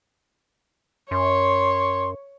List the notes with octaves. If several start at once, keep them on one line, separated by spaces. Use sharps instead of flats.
F#2 C#5 C6